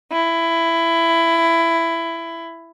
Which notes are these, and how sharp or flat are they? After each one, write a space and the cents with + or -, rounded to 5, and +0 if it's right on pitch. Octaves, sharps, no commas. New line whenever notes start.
E4 +15